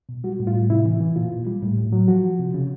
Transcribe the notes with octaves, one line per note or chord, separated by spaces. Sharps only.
B2
G3 F#4
A2
F4
A2
C3 E4
E3
E3
A#2 F4
A#2
G3
A2
A2
F#3
F3 F#4
F3
C3
C#3